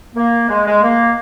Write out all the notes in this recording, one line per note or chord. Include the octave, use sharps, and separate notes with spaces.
A#3
G#3
G#3
A#3